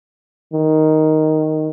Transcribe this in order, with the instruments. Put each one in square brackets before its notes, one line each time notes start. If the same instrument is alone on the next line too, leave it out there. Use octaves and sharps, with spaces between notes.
[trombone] D#3